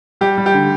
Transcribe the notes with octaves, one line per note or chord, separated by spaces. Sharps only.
G3 G4
G3
G4
D3